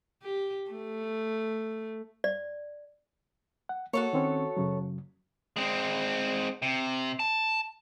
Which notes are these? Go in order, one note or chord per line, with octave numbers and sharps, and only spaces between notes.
G4
A3
D5
F#5
A#3 F#4 A4 C#5
D#3 C4 C#4
F#2 C#3 F#3
G#3 C4
C3
A5